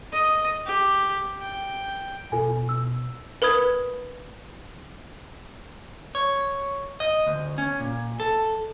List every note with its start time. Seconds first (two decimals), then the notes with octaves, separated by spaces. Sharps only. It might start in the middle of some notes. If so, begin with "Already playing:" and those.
0.12 D#5
0.66 G4
1.41 G5
2.32 B2 F4 A4 G#5
2.69 E6
3.42 A#4 B4 B5 D#6 G#6
6.15 C#5
7.00 D#5
7.27 D2
7.58 C#4
7.80 A#2
8.20 A4